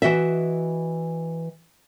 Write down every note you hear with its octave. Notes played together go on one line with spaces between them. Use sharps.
E3 F#4 D#5 E5